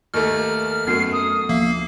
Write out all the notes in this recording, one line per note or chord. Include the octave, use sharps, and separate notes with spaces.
D#2 A3 F6
F#2 A3 B3 C4 C7
D#6
D2 F3 A#3 E5 C7